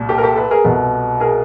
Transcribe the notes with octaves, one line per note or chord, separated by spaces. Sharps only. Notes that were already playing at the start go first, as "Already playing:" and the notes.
Already playing: C2 A#2
G4 A4
A#4
G4 A4
A4 B4
G#4 A#4
C2 B2 A4 B4
G#4 A#4